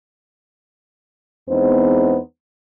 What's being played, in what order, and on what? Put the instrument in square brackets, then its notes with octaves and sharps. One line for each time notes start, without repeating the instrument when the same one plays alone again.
[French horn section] E2 G#3 B3 C4 D#4 C5